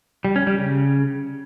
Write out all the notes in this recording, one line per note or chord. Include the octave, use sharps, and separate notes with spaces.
G3
C#4
G3
C#3